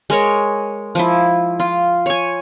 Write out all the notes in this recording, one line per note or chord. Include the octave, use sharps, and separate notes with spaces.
G#3 A#4 C#5
F3 E4
F4
C#5 G#5